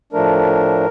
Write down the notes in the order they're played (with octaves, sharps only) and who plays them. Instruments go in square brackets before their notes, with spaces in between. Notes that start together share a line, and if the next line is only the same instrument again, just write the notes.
[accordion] A2 F3 A3 D4 A#4